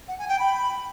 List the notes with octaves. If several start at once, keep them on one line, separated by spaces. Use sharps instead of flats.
F#5
G#5
G5
B5